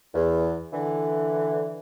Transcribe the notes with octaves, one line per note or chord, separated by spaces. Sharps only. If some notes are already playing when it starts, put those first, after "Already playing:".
E2
D3 E3